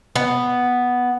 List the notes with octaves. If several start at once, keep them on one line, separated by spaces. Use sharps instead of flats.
B3